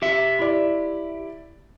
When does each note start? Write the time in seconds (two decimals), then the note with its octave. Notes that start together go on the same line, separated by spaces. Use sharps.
0.02 G4 E5
0.39 E4 D5